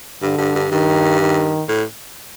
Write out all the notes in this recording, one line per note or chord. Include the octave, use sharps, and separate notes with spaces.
G2 D3
G2
G2
G2 D#3
D#3
A2